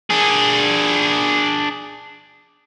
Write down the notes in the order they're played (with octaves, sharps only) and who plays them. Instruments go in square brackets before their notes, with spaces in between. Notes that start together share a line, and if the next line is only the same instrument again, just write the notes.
[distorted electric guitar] D4 G#4